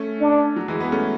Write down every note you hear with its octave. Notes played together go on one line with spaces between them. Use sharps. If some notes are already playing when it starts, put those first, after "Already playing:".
Already playing: A3 C#4
D4
F#3
E3 G#3
G#3 B3
A3 C#4